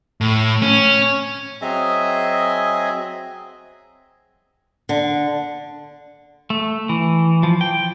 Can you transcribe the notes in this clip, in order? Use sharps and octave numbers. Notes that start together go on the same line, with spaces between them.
A2
C#4
F#3 C4 G#4 D#5 E5 G#5
D3
A3
E3
F3
G5